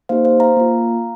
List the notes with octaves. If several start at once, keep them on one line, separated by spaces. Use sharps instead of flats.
A#3 D#4 G4 C5 F5
C5 F5
F5 A#5
A#3 F4